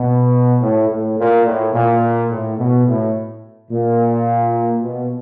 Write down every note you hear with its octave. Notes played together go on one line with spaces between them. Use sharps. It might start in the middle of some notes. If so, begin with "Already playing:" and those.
Already playing: B2
A2
A2
A#2
A2
A#2
A2
B2
A2
A#2
B2